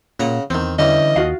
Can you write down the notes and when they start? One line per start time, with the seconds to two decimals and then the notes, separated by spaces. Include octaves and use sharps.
0.20 A#2 C#3 F#5 A#5
0.50 E2 D#3 C4
0.79 D3 E3 G3 C#4 D#5
1.16 D#2 F4 F#4 F5